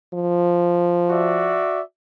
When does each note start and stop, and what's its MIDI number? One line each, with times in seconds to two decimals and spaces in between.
0.14 1.65 53
1.10 1.81 66
1.10 1.81 74
1.10 1.81 76